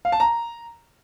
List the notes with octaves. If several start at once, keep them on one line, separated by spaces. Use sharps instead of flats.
F5
A5
A#5